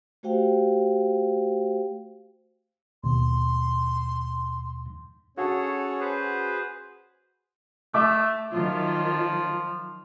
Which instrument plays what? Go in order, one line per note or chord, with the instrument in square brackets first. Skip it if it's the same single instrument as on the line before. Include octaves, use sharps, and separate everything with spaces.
[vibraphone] A3 F#4 G4 C5 F5 G5
[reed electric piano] D#2 B2 [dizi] C6
[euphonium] C#4 [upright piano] F#4 [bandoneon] G#4 A4 C#5
[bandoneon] G#4 B4 C5
[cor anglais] A3 [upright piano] E5 D6
[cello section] D#3 F#3 F4 [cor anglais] F3